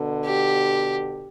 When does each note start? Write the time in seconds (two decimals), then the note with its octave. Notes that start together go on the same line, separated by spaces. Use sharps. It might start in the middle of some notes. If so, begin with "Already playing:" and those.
Already playing: B2 D3
0.25 G4